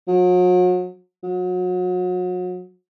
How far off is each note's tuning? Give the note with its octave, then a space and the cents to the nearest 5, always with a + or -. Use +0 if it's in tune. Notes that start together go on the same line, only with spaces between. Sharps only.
F#3 -40
F#3 -35